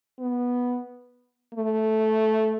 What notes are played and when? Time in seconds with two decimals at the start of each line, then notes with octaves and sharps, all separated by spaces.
0.19 B3
1.54 A3